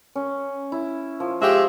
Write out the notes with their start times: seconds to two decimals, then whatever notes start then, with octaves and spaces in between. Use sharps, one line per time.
0.16 C#4
0.72 E4
1.20 F3
1.41 F3 G#3 G4 E5